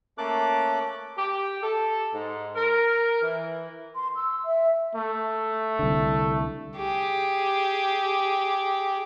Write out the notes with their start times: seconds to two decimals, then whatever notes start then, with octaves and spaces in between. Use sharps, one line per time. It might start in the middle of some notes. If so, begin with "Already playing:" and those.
0.18 A3 A#3 C#4 A4 D6 F#6
1.17 G4
1.62 A4
2.13 G#2
2.55 A#4
3.21 E3
3.95 C6
4.16 E6
4.45 E5
4.95 A3
5.79 C2 D3
6.77 G4 G#4